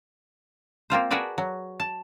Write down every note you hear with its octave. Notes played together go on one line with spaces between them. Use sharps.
A#3 C4 F4 C5
F#4 G#4 A#4 B4 D5 A5
F#3
A5